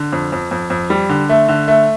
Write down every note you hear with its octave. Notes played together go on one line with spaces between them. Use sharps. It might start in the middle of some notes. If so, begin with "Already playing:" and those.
Already playing: D3
F2
F2
F2
F2
G3
D3
A3
D3
A3